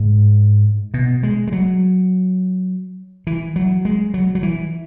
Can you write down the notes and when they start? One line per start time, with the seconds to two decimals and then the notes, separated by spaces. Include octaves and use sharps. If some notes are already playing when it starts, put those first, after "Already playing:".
Already playing: G#2
0.94 B2
1.23 G#3
1.47 G#3
1.52 F#3
3.27 E3
3.56 F#3
3.85 G#3
4.14 F#3
4.35 F#3
4.43 E3